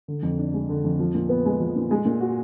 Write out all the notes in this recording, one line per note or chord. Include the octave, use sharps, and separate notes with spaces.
D3
F2
D4
G#3
D3
F2
F3
A#2
B3
G#3
F3
A#2
G#3
A#2
F#4